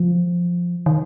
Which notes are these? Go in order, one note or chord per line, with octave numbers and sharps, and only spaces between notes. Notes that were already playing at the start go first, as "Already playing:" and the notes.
Already playing: F3
D#3